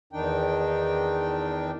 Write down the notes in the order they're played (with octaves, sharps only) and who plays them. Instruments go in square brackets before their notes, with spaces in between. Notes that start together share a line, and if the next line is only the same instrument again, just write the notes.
[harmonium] E2 D#3 D4 D#4 G5